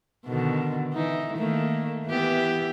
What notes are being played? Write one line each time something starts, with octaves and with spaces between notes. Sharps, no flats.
B2 D3 D#3
E3 D#4
D#3 A3 A#3
E3 B3 G4